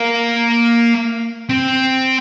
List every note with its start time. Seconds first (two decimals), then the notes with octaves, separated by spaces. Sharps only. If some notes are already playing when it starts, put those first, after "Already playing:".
Already playing: A#3
1.50 C4